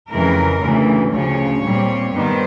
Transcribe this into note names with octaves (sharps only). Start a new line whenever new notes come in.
F2 C#3 E3 A3 A#4
D2 C#3 E3 A3
D2 C#3 F3 C#5
A#2 G3 C4
G2 D#3 G3 B3 C5